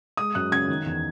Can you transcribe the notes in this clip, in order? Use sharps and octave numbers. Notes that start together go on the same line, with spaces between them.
G#3 D#6
F#2 F#6
C#3 G#6
D#3
E2